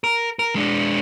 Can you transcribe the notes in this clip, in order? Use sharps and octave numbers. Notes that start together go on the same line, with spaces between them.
A#4
A#4
G#3 D4